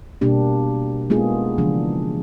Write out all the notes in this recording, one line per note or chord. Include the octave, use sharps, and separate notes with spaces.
B2 G3 A#3 D4 G4
G#3 A#3 B3 D#4 F4 G#4
C#3 E3 F3 G#3 D4